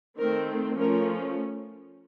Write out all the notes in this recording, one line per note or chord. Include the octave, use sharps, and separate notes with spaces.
D#3 A3 C4 A#4
F3 A3 C#4 A#4